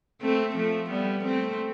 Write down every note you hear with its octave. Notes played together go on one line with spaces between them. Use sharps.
A3 C4
F3 A3
G3 B3
A3 C4